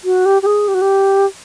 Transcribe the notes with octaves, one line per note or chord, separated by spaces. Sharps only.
F#4
G4
G4
G#4
G4
F#4
G4